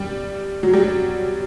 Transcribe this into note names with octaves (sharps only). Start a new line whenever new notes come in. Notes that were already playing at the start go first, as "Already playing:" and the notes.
Already playing: G3
F#3
G3